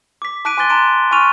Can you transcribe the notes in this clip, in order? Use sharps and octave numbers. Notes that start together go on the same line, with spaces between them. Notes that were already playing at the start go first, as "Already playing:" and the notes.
D6 B6
A5 D6 F#6 B6 D7 D#7
G#5 C6 D6 F#6 A6 G7
A5 A#5 C6 D7 D#7
G#5 A5 C#6 F6 D#7 F7